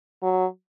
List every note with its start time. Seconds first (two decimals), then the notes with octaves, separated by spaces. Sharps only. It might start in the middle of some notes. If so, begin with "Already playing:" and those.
0.22 F#3